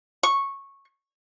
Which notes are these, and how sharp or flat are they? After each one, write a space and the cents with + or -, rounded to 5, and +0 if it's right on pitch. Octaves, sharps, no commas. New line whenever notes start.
C#6 -10